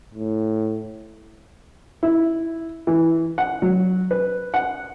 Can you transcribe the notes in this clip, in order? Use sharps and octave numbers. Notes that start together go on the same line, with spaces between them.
A2
E4
E3
F#5
F#3
B4
F#5